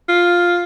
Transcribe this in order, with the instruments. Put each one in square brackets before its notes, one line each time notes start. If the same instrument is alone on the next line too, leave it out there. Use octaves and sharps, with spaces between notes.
[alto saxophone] F4